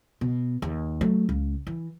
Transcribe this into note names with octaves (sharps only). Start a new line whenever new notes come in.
B2
D#2
F#3 A3
C#2
E3